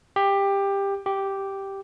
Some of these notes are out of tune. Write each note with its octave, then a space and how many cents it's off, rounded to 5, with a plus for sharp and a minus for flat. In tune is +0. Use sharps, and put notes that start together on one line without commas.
G4 +15
G4 -5